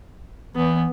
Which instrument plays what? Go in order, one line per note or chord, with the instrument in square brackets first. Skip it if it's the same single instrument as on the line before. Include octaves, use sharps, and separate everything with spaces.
[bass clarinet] E3 [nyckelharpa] B3